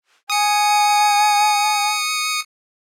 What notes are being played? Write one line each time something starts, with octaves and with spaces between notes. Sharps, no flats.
G#5 D#6 C#7